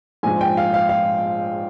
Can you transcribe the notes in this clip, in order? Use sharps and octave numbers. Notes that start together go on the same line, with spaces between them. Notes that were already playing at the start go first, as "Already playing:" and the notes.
A#1 G#2 F3 G#5
G5
F5
F5
F5